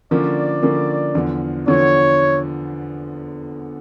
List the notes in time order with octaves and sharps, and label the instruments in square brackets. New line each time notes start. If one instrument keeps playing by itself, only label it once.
[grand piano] D3 F3 A#3 C#4 [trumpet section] D5
[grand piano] D3 F3 A#3 C#4
E2 D3 F3
[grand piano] E2 D3 F3 [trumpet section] C#5